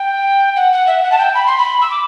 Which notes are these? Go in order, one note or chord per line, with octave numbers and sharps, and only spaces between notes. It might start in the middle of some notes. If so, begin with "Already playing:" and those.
Already playing: G5
F#5
F#5
E5
F#5
A5
G5
B5
C6
B5
E6
D6